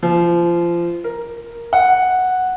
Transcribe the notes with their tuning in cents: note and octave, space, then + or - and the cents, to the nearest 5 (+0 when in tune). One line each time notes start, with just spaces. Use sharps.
F3 -25
A#4 +5
F#5 -5